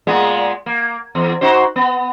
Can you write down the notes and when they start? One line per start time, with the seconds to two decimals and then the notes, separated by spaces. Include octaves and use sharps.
0.07 A#2 G#3 B3
0.66 A#3
1.15 E2
1.41 D#4 F#4 C5
1.76 B3